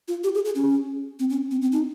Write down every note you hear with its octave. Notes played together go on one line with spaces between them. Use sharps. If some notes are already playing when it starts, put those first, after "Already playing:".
F4
G4
G#4
G#4
C#4
C4
C#4
C4
C4
D#4